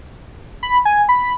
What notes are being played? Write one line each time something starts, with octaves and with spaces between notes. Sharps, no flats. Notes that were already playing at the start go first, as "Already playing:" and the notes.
B5
G#5
B5